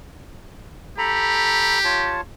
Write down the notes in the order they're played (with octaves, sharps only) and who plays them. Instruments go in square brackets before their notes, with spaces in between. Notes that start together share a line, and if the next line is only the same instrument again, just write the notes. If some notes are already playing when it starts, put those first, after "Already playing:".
[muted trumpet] G4 [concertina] A4 A#5 B5
[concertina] F4 C#5 A5